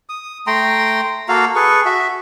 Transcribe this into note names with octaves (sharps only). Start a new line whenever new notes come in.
D#6
A3 G5 A#5 C6
A#3 F#4 A4 F5
G#4 A4 B4 C#6
F#4 E5